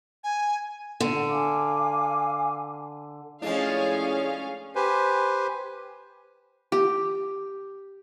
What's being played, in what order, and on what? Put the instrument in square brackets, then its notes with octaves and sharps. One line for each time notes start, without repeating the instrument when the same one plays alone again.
[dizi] G#5
[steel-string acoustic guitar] D3
[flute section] F5 G#5 D6
[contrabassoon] A2 [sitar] F3 G#3 D4 [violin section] C#4 F5 [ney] G#4
[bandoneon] G4 B4 C5 G#5
[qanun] G4